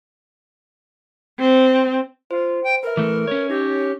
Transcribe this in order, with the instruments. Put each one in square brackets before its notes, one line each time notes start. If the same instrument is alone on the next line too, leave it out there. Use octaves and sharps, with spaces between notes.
[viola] C4
[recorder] F4 [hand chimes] C5
[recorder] G5
[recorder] A#4 [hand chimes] B4 E5
[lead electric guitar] E3 A3
C#4 C#5
[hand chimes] D#4 A#6 [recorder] G4